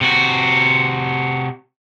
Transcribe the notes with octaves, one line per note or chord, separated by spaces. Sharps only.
C3 F#4